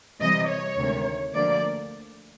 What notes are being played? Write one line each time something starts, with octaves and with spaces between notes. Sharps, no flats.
C3 E3 G3 D#5
C#5
D2 C3 D#3 G#3
D2 D3 F3 A#3 D5